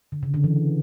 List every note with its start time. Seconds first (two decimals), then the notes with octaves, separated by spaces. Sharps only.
0.12 D3
0.23 C#3
0.34 D3
0.44 E3